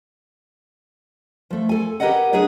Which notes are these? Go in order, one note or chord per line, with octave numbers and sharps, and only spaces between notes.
F3 A3
A4 G#5
G4 A#4 B4 C#5 D#5 F#5
D4 G#4 A#4 B4 C#5